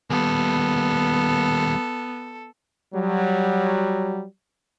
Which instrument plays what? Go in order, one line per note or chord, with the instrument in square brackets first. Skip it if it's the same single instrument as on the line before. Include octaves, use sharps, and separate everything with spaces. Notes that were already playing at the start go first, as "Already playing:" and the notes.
[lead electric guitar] D#2 G3 [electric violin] B3 [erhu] A4
[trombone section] F#3 G3